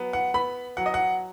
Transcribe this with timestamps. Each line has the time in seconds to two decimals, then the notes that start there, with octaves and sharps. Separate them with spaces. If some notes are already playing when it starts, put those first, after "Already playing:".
Already playing: F#3 B3
0.13 F#5
0.34 B3 B5
0.77 F#3 F#5
0.86 D#5
0.94 F#5